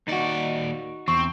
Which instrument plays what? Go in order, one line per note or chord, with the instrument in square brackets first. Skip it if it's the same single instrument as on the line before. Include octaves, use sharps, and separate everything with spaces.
[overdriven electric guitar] D#2 D5 [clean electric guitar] D#4 F#4
[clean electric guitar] E2 [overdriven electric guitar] C4 [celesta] C#6